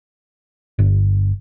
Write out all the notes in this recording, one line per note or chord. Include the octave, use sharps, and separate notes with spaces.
G1